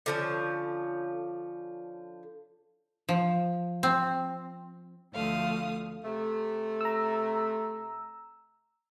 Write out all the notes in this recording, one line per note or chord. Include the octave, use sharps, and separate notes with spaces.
D3 F3 C#4
F3
C4
D2 F3 A3 F5 D#6
C3 A3
A#5 E6